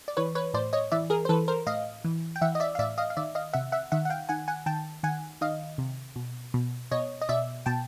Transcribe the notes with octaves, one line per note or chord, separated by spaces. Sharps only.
D5
E3 B4 C#5
B4 C#5
A2 C5 D5
C#5 D#5
E3 D5 E5
G#4 A#4
C5
E3 A4 B4
A#4 C5
A2 D#5 F5
E3
G5
E3 E5 F#5
D#5
D5 E5
F5
A2 D5 E5
D#5 F5
F5
D#3 D5 E5
D#5 F5
C3 E5 F#5
E5 F#5
D#3 E5 F#5
F#5
F5 G5
D#3 F#5 G#5
F#5 G#5
D#3 G5 A5
D#3 F#5 G#5
D#3 D#5 F5
C3
B2
B2
B2 C#5 D#5
D#5
B2 D5 E5
B2 G5 A5